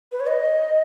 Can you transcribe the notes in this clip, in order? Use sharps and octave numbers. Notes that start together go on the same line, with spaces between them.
B4
C#5
D#5